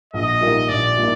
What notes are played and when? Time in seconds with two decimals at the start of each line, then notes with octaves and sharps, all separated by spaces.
0.13 A#1 D#5
0.41 A#2 G3 A#3 D#4
0.68 A#1 D5
0.97 A#2 G3 A#3 D#4